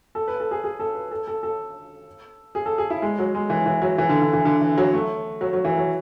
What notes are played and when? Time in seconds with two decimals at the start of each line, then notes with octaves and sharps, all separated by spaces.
0.15 A4
0.28 B4
0.40 A4
0.51 G#4
0.64 G#4
0.80 A4
0.95 B4
1.11 A4
1.27 A4
1.43 A4
2.55 G#4
2.66 A4
2.78 G#4
2.90 E4
3.02 G#3
3.19 F#3
3.35 G#3
3.50 E3
3.66 E3
3.82 F#3
3.98 E3
4.09 D3
4.22 D3
4.33 E3
4.45 D3
4.61 E3
4.78 F#3
4.93 A3
5.41 F#3
5.53 F#3
5.65 E3
5.77 F#3